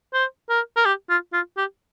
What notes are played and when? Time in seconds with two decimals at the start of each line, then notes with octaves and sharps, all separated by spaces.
0.13 C5
0.49 A#4
0.76 A#4
0.85 G4
1.09 F4
1.33 F4
1.57 G4